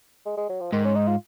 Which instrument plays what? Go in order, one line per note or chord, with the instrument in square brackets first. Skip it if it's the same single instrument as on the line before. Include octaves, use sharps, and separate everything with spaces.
[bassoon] G#3
G#3
F#3
F3
[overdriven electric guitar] G#2 [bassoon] D#3
[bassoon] C#4
D#4
F4